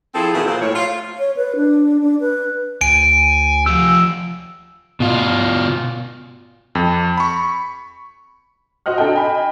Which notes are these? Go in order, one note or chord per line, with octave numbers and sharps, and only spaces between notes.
F3 C4 E4 G#4 A4
B2 D#3 E3 A3 F4 G#4
A#2 A4 C5
A2 C#5
F4
C#5
B4
D4
D4
B4
D2 G#5 D7
F3 G4 E6
B2 F4
F2
B5 C#6
F#4 C5 D#5 F#5 F6
D4 F#4 A4 D#5 F#5 G5
D#5 G5 G#5 B5